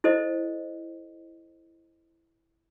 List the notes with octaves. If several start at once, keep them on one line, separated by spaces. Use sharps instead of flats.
E4 A4 C5 D#5